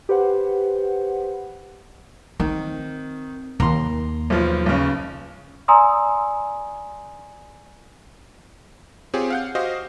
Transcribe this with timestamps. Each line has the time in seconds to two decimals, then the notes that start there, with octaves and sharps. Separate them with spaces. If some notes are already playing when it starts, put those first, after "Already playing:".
0.09 G4 B4 C5 F#5
2.40 D#3 C4
3.60 D#2 A#5 C6
4.30 B1 F3
4.66 B1 C#3
5.68 D5 G#5 A#5 C6 D#6 E6
9.14 C4 F4 G4 G#4 C#5
9.30 F5 F#5 G6
9.55 F#4 G4 C5 D#5 F5